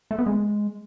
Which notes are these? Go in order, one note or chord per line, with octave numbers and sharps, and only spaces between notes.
A3
B3
G#3